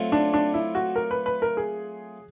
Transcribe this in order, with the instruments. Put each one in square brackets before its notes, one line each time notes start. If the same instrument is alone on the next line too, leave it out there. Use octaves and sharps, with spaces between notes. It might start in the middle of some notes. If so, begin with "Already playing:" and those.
Already playing: [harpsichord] F#3 A3 C4 F4
[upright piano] D4
D4
E4
F#4
A#4
B4
B4
A#4
G#4